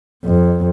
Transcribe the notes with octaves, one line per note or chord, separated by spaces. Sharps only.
F2